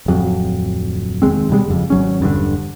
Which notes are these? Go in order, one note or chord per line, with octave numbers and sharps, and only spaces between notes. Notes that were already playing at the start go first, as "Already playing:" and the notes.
D1 F2 F#3
F1 D#2 G#3 C4
D#2 B2 G3 G#3
F#1 F2
G#1 F#3 C#4
E1 G2 A#2 D3